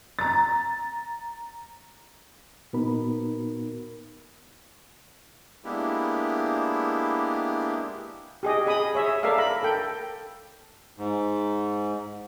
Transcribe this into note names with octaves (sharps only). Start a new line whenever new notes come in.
A#5 A6
A#2 B3 D#4 F#4 A#4 B5
G#3 A#3 B3 D4 E4 G4
G4 G#4 D#5
G#4 D#5 B5 D#6
G#4 C#5 E5
A4 A#4 D5 E5 F5
A#4 A#5 B5
A4 G5
G#2